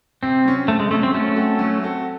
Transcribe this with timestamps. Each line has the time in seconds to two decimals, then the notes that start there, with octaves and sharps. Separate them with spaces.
0.23 C3 C4
0.45 F#3 C#4
0.68 C3 A3
0.80 G#3
0.91 F#3 A3 C#4
1.03 C4
1.14 F#3 A3 C#4
1.36 C4 F#4 A4
1.59 F#3
1.82 C4 F#4 A4